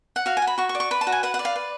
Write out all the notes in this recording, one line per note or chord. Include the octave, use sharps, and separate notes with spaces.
F#5
F#4 F5
G#5
F#4
B5
F#4 C#6
C#6
D5
C#6
B4 B5
A5
F#4
G#5
B4 F#5
F#5
D5
F5
B4